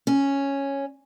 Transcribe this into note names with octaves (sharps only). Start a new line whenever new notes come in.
C#4